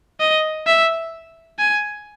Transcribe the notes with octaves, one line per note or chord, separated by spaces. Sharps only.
D#5
E5
G#5